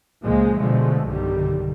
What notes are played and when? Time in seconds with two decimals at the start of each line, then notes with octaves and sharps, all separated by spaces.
0.23 C#2 A#2 F3 G#3 A#3
0.58 B2 D3 F3 G#3 A3
1.07 B1 G2 D3 D#3 G3